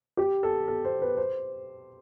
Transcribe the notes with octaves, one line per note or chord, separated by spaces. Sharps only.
G4
A4
A4
C5
B4
C5